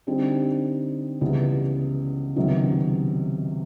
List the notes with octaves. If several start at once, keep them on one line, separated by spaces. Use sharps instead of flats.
D3 G3 C4 D#4
C#2 C#3 E3 G3 B3
C#2 C3 D#3 F#3 B3